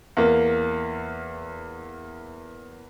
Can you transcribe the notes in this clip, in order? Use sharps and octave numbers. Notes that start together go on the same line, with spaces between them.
E2 A#3